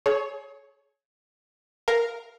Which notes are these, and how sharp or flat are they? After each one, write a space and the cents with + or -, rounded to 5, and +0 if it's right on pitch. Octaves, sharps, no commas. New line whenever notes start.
G#4 +40 C#5 +0
A#4 +0 F5 +0